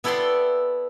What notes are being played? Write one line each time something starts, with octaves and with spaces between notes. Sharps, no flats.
B3 E4 A4 D5 G5 C6